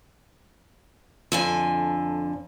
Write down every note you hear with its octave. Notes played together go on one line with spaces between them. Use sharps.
F2 D3 G#5